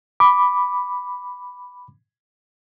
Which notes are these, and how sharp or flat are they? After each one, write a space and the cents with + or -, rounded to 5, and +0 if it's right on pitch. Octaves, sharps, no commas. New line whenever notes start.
B5 +0 D6 +0